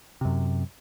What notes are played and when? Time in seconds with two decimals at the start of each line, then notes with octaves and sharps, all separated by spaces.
0.21 F#2 C3